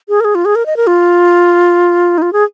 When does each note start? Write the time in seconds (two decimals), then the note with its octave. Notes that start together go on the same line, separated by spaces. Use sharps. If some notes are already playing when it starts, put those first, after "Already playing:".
0.09 G#4
0.20 A#4
0.25 G#4
0.35 F4
0.45 G#4
0.55 A#4
0.66 D#5
0.77 A#4
0.87 F4
2.18 D#4
2.22 F4
2.33 G#4